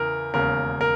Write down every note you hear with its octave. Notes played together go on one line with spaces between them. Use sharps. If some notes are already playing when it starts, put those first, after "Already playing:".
Already playing: E2 C#3 E3 A#4
E1 D#2 C#3 A#4
A#4